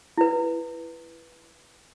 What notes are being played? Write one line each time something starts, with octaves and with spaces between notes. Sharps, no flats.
E4 B4